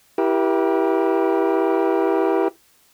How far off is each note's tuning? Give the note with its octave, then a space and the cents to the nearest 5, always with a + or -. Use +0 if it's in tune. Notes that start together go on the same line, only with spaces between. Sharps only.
E4 +0 G4 -5 A#4 +45